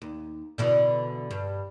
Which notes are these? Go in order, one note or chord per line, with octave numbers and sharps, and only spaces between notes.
D#2
B2 D3 E3
G2